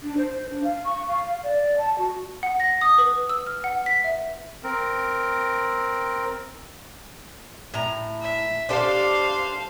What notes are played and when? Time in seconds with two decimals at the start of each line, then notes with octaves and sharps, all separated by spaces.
0.03 D4
0.18 C5
0.50 D4
0.64 F5
0.85 C#6
1.08 F5
1.44 D5
1.78 A5
1.98 F#4
2.43 F#5
2.60 A#6
2.81 D#6
2.98 B4
3.29 E6
3.47 F6
3.64 F#5
3.86 B6
4.04 E5
4.64 C4 A#4
7.74 A2 A#5
8.21 E5
8.69 D4 G4 A4 C5 F5